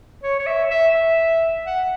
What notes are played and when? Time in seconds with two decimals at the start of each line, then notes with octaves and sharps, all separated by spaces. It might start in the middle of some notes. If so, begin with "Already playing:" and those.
0.23 C#5
0.39 C#5
0.46 E5
0.71 E5
0.94 E5
1.66 F#5